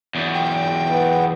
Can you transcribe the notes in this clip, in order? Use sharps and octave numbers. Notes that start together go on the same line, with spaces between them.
E2 F#3
G5
B3